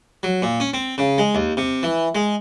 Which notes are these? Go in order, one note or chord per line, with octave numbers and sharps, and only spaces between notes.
F#3
A#2
C#4
C4
C#3
G#3
D#2
C3
E3
G#3